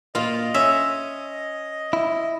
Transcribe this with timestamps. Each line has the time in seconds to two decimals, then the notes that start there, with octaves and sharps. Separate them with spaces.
0.15 A#2 F4 D#5
0.54 C#4 E5
1.93 E4